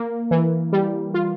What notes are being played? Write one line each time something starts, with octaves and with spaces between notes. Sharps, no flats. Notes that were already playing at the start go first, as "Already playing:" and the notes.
Already playing: A#3
E3
G3
F4